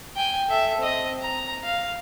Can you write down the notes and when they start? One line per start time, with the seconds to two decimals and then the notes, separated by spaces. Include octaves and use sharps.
0.16 G5 G#5
0.49 A4 E5
0.78 C4 D#5
1.21 A#5
1.63 F5